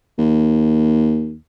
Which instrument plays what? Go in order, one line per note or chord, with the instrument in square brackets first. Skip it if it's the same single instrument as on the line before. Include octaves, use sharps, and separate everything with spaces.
[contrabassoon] D#2